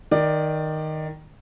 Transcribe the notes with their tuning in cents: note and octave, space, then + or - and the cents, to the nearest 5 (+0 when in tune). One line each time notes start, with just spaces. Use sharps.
D#3 +0 D5 +15